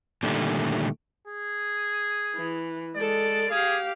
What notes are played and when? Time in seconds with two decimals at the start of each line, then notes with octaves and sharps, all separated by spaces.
0.23 A#2 D3 D#3 G3 A3
1.27 G#4
2.36 E3
2.96 G#3 A4 D5
3.51 G4 G#4 F5